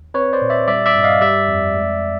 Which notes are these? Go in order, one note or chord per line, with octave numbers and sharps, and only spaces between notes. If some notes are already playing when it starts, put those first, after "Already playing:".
Already playing: D#2
C4 B4 C#5
C5 D5
A#2
D5 E5
G3 D5 E5
D5 E5
G2
D#5 F5
G3 D5 E5
F2
G#3